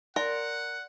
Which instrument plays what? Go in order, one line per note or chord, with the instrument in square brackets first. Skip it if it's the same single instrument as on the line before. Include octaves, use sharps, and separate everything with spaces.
[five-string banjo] A#4 [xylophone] D5 C6 A#6 [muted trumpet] F#5